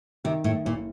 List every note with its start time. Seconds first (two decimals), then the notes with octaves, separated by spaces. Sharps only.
0.24 C3 D#3
0.44 A2
0.65 F#1 A#2